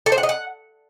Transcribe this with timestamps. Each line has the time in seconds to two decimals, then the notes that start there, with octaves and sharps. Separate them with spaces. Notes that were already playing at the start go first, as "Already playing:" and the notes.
0.06 A4
0.12 C5
0.18 F#5
0.23 D#5
0.29 F#5